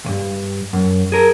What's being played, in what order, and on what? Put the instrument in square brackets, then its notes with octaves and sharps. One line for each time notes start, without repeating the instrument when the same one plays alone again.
[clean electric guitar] C#2 G2
F#2
G#4 A#4